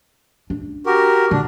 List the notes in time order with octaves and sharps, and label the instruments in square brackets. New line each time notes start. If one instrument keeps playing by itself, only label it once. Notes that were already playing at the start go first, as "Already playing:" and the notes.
[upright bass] D4
[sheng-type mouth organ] F#4 G4 A#4
[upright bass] D3 [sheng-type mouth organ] D4